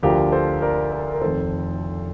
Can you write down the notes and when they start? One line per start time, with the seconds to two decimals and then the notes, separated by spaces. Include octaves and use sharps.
0.03 D2 D3 F3 G4 A#4
0.32 A4 C5
0.62 A#4 D5
0.92 A#4 D5
1.13 A#4
1.21 F1 F2 D#3 A4 C5